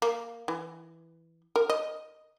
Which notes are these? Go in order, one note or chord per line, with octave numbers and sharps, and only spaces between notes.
A#3
E3
A#4
D#5